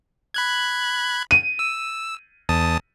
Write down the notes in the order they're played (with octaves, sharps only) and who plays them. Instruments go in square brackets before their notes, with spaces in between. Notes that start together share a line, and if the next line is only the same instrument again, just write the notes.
[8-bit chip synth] B5 F#6 G#6
[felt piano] D#7
[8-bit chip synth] E6
E2 A5 D#6